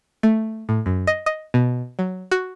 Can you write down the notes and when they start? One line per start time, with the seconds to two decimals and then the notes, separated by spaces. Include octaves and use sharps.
0.23 A3
0.69 A2
0.86 F#2
1.07 D#5
1.26 D#5
1.54 B2
1.99 F#3
2.31 F#4